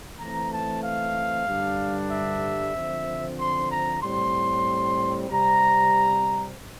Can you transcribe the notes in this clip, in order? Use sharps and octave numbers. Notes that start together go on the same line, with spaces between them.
E3 A3 C4 A#5
A5
F5
G2 D3 G3 D4
E5
D3 F3 C4
C6
A#5
A2 G3 C4 C6
C3 G3 C4 A#5